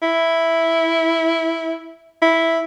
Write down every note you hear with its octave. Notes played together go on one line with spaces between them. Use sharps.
E4
E4